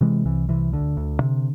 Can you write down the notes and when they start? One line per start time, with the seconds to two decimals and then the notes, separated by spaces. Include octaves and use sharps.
0.01 C3 E3 G#3
0.25 C2 E3
0.49 C3 E3
0.72 D2 D3
0.97 D2
1.20 C3